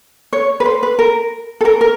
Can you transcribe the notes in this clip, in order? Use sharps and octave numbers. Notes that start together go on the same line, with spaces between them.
C#5
B4
C5
B4
A#4
A4
A#4
A#4